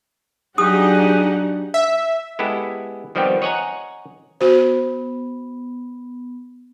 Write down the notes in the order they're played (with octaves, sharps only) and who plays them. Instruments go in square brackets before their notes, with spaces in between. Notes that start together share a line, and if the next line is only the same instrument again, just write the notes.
[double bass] F#3 D4 [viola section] D#4 G4 F#5 [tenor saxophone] G#4 [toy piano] D#6
[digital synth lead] E5
[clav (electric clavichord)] G#3 B3 E4 G4 A4
D#3 F3 G3 B3 C4 G4
C#5 D#5 F#5 G#5 A#5
[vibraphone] B3 [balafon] F#4 C5